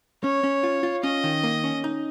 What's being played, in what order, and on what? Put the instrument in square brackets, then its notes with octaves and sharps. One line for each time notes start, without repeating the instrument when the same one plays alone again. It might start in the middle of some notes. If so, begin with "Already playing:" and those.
[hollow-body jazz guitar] C#4 [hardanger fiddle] C#5
[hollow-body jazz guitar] C#4
F4
F4
[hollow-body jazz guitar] C#4 [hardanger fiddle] D#5
[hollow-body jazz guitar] D#3
A#3
C#4
D#4